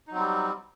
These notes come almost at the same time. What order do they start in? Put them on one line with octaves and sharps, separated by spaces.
D#4 F#3 C4 G3